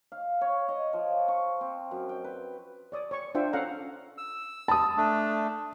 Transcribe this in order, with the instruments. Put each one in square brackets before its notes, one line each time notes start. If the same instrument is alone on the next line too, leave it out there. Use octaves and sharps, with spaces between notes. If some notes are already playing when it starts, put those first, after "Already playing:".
[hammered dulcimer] F5
C#5
D#5
F3
C#6
C4
F#2
G5
B4
[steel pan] C#5 D5 D#6
C#5 C#6
D4 F4 C5 E5 G5
C#4 A4 F5 F#5 A#5
[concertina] E6
[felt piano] A5 D#6
[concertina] A3 D4